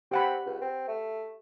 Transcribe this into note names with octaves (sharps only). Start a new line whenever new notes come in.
C4 G4 F#5 B5
C#2
C4
A3